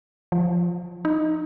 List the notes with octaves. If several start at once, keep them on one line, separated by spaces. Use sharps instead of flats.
F3
D#4